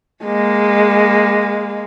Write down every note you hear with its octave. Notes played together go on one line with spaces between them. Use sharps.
G#3 A#3